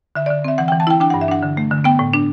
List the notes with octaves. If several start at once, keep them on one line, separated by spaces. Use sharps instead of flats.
D3 E5
D5
D3
C4 E5
E3 F#5
G5
E3
A5
E4 G5
D4 G5
F#5
G2
E5
D4 F#5
D3
A3
D3
B3 G5
A2
D4